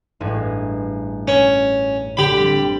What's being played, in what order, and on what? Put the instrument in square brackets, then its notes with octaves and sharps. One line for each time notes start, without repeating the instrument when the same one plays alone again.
[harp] A1 G2 G#3
[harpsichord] C#4
[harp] D3 [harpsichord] G4 B5
[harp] G3 C4 B6